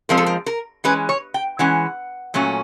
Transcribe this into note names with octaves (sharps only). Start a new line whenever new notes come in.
F3 G#3 C4 A#4
A4
A#4
A#4
E3 G#3 C#4 B4
C#5
G5
E3 G#3 C#4 F#5
A#2 F#3 A3 C#4